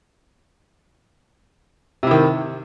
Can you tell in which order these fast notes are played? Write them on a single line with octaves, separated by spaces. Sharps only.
C3 E4 D#3